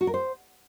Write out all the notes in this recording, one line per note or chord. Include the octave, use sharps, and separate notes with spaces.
F#4
A#4
C5